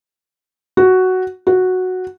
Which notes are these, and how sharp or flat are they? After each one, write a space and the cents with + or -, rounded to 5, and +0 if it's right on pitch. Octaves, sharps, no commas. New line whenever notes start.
F#4 +5
F#4 -5